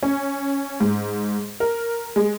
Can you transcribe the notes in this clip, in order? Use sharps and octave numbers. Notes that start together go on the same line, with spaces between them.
C#4
G#2
A#4
G#3